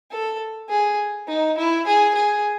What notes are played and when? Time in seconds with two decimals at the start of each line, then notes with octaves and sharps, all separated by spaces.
0.12 A4
0.69 G#4
1.27 D#4
1.57 E4
1.87 G#4
2.15 G#4